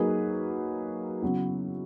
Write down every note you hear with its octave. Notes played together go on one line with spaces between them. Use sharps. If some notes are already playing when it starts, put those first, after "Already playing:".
Already playing: F#3 A#3 D#4 G#4 B4
C#3 F#3 B3 E4